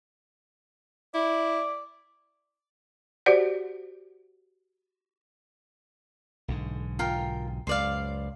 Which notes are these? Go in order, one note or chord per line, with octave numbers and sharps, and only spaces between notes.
E4 D5
F#4 G4 C5 D5 F#5
B1 G#2 D3
F4 A#4 G5
C#2 F#2 C5 D5 F5